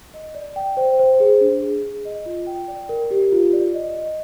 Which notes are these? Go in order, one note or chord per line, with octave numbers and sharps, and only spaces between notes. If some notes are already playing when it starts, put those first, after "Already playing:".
D#5
D5
G5
C5
C5
G#4
D4
G#4
G#4
D#5
F4
G5
D5
A#4
G4
F4
D5
D#5
D#5